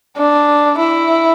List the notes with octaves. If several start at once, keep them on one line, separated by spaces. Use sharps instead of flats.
D4
E4